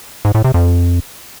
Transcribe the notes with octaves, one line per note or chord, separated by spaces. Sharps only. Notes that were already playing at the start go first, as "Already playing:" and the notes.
G#2
A2
C3
F2